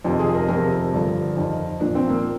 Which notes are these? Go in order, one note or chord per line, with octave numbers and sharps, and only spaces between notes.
F2 C3 D#3 F4
G#4
A#4
F2 C3 F3 A#4
G2 D3 F3
F2 D#3
A#2 F3 D4
C4
A#3